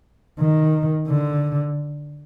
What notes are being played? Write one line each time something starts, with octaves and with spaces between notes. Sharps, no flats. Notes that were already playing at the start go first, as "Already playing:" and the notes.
D#3
D3